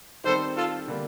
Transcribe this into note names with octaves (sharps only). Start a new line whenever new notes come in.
D#3 G3 C4 A4 C5
F4 A4
D3 G3 A#3